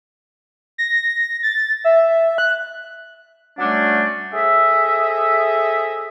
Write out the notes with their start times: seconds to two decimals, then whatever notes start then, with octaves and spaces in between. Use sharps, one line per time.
0.78 A#6
1.43 A6
1.84 E5
2.38 F#6
3.59 F#3 G3 A3 C#4 D4
4.32 G#4 A4 C5 D#5 E5